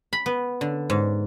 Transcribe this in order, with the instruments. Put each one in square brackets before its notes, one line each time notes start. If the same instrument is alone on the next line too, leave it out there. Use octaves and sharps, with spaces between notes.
[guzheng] B5
B3
D3
G#2